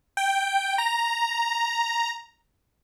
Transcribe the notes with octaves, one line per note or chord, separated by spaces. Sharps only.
G5
A#5